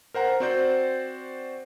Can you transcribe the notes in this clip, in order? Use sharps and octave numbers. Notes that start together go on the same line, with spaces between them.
A#4 C5 F#5 A#5
C4 F#4 C5 D5 G6